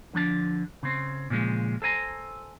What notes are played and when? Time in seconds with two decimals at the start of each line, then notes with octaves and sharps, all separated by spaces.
0.13 D3 F3 D4 A5
0.83 C#3 C4
1.30 A#2 C#3 F3 G#3
1.82 A4 C5 G#5 A#5